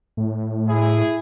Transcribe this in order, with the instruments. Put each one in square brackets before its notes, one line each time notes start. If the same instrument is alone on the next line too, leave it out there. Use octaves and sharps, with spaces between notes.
[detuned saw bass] A2
[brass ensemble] E4 G#4